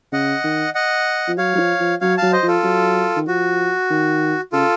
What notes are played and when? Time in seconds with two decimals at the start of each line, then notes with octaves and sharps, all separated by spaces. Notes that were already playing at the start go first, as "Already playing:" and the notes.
0.12 C#3 D#5 F#5
0.44 D#3
0.75 D#5 F#5
1.28 F3
1.38 F#3 C#5 F5
1.55 F#3
1.59 F3
1.80 F3
2.01 F#3 C#5 F5
2.18 F#3 F5 A5
2.32 C5 D#5
2.43 F3 F4 A4
2.64 F#3
3.16 D#3
3.27 F3 F#4
3.90 D#3
4.53 C#3 F4 A4